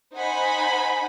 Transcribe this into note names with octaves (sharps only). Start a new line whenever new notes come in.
D#4 C5 F#5 G#5 B5